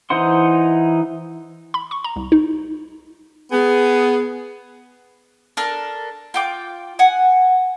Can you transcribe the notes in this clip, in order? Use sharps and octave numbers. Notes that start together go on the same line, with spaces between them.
E3 D#4 C5 F#5 C6
B5
C#6
A#5
C2
D#4
B3 G#4
D4 A4 A#4 F6
F4 G5 D6
F#5 G#5